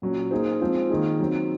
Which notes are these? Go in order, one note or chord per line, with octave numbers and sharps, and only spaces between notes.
A#2 F#3 C#4
A#3 D#4 G#4 C5
F3 G#3 C4 F4 C5
D#3 A#3 D#4 G#4
F#3 C4 D#4